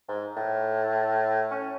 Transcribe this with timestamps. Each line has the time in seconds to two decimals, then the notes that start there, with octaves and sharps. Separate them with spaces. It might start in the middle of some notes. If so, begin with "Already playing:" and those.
0.08 G#2
0.36 A2
1.51 C#4